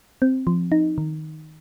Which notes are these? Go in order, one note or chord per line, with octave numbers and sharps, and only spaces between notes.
C4
F3
D#4
D#3